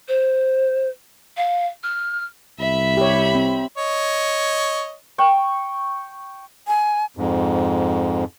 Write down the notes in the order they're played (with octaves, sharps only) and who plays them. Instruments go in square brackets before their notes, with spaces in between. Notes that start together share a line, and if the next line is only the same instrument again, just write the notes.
[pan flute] C5
F5
F6
[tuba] C2 [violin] E5 B5
[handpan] G4 C#5
C4
[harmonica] C#5 D#5
[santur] G5 C#6
[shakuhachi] G#5
[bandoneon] F2 G#2